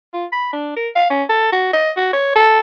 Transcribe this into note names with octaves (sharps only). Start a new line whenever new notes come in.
F4
B5
D4
A#4
F5
C#4
A4
F#4
D#5
F#4
C#5
A4